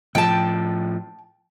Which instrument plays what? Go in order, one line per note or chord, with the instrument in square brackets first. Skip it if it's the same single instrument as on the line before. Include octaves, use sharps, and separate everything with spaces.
[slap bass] A2 F3 [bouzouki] G5 A5